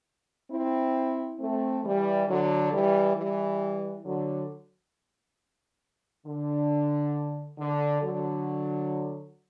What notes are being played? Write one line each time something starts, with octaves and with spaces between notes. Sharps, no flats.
C4 E4
A3 C4
E3 G3
D3 F#3
E3 G3
E3 G3
D3 F#3
D3
D3
D3 F#3